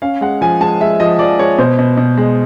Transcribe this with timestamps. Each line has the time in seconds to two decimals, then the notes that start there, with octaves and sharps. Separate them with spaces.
0.02 C#4 F5
0.21 G#3 F#5
0.41 F3 G#5
0.61 G#3 A5
0.80 G#3 E5
1.00 F3 D#5
1.19 F3 D5
1.39 G#3 C#5
1.58 B2 C5
1.79 B2
1.97 B2
2.17 G#3